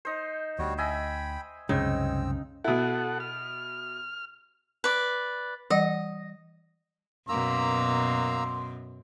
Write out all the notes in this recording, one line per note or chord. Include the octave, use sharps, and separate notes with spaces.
D#4 C5
D2 G3 F#4 C#5
D#5 E5 G5 G#5 B5
C2 F#2 C#3 G#3 C4 D#4 E6
B2 E4 A4 F#5
F6
B4 D5
E3 G3 D#5 F#5
F#2 B2 A#3 A#5 C6 E6